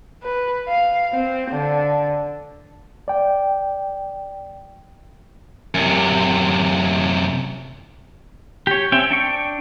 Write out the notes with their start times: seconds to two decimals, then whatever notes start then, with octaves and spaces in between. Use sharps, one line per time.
0.23 B4
0.68 F5
1.13 C4
1.51 D3
3.08 D5 G5
5.75 F#2 C3
8.67 G4 C#5
8.92 C4 C#4 E5 G5
9.11 D4 G5 C#6